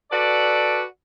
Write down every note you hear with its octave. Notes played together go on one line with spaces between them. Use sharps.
F#4 A4 B4 D5